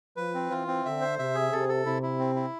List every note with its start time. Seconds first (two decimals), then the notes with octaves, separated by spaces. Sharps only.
0.17 F3 B4
0.34 C4
0.51 E3 F4
0.68 C4
0.84 D3 E5
1.01 C5
1.19 C3 E5
1.35 G#4
1.53 C3 A4
1.69 A4
1.85 C3 E4
2.03 E4
2.19 C4
2.36 E4